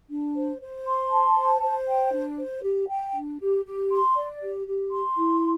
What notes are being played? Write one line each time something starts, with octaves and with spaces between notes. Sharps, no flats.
D4
C5
C5
C6
A5
C5
C5
G5
D4
C5
G4
G5
D4
G4
G4
C6
D5
G4
G4
C6
E4